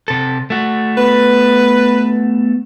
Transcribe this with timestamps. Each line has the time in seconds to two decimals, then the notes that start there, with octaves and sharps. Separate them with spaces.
0.08 C3 A4
0.50 A3 F#4
0.97 B3 B4